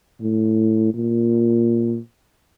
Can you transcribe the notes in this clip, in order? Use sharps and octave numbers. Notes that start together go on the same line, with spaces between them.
A2
A#2